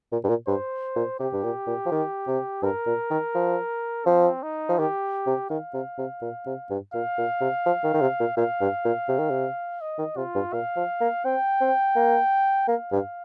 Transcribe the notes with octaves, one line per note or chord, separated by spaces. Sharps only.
A#2
G2
A#2
G2 C5
A#2
C3 G4
G2
A#2
A#2
F3
D#3
C3
G2 A#4
A#2
D#3
F3
F3 C4
D#4
F3
D#3 G4
C3
D#3 F5
C3
C3
A#2
C3
G2
A#2 F5
A#2
C3
F3
D#3
D#3
C3
A#2
A#2 F5
G2
A#2
C3
D#3
C3
D#5
D#3
C3 F4
G2
A#2 F5
F3
A#3
C4 G5
C4
A#3
A#3 F5
G2